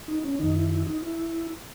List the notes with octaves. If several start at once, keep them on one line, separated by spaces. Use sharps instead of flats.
D#4
C#4
F#2 D#3 D#4
E4
E4
D#4
E4